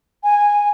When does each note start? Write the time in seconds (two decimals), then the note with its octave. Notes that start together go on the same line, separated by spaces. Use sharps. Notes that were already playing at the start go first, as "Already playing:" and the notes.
0.23 G#5